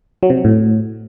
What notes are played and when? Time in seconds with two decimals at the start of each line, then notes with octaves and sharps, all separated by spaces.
0.23 F#3
0.30 C3
0.37 F#3
0.45 A2